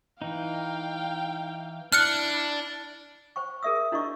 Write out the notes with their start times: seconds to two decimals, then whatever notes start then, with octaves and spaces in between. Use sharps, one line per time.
0.22 E3 D#4 F5 G5
1.92 D4 E4 F6 F#6 C#7 D7
3.36 C5 G5 C#6
3.62 G#4 A#4 D5 E5 D#6 E6
3.92 D4 E4 F#4 D5 D#5 C#6